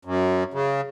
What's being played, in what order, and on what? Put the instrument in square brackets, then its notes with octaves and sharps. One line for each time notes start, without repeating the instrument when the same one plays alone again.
[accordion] F#2
C#3